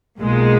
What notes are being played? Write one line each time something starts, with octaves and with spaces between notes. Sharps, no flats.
B1 A#2 G#3